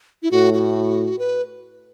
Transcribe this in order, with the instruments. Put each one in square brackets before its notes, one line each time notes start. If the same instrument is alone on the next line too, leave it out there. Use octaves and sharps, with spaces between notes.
[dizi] E4
[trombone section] A2 [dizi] F#4
[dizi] F#4
B4